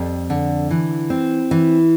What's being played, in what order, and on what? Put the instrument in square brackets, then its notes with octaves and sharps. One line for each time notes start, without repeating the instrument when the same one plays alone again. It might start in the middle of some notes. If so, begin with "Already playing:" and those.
Already playing: [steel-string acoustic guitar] F2 G3
D3
E3
C4
E3